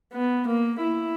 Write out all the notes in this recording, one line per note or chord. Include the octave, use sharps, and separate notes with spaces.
B3
A#3
E4